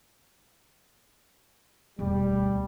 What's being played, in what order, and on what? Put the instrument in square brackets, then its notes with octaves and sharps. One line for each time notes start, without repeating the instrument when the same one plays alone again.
[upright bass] E1 D2 [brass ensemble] G3